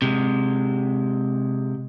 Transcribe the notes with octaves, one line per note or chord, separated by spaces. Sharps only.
C3 G#3